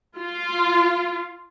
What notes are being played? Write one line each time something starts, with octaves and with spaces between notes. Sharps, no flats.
F4